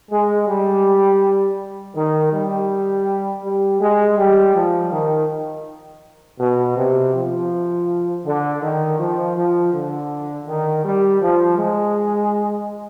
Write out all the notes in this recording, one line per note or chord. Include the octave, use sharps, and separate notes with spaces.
G#3
G3
D#3
G3
G3
G#3
G3
F3
D#3
B2
C3
F3
D3
D#3
F3
F3
D3
D#3
G3
F3
G#3